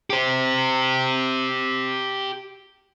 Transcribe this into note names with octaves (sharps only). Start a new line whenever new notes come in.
G4 C5